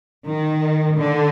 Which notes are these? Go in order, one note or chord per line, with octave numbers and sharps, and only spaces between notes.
D#3
D3